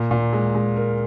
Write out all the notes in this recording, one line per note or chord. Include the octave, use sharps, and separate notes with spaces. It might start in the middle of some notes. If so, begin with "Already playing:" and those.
Already playing: A#2
A#2
G#3
G#3
A#4